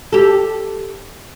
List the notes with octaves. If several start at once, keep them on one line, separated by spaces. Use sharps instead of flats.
G4 A4